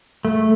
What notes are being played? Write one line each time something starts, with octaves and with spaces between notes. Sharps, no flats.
A3